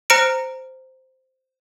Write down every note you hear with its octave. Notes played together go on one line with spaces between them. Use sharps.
C5 A#5 F6 A#6 C#7 D7